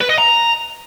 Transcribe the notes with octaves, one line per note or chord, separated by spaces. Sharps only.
B4
D#5
A#5